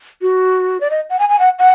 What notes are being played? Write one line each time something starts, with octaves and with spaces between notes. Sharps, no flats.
F#4
D5
D#5
F#5
G#5
G#5
F#5
F#5